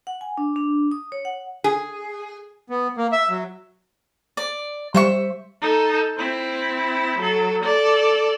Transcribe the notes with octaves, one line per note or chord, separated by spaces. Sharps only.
F#5
G#5
D4
D4
D#6
C#5
F#5
G#4
B3
A#3
E5
F#3
D5
G3 C5 E5 C#6
D#4 A4
C4 E4
F#3 A4
A4 D5